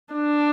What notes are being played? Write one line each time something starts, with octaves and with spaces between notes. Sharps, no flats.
D4